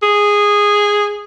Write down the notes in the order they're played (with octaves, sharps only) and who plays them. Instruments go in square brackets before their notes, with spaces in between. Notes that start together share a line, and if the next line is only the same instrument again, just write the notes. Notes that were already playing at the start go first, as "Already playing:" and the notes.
[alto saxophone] G#4